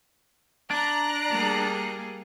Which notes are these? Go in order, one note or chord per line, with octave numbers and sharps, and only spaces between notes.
D4 A#5 F#6
G3 A#3 G#4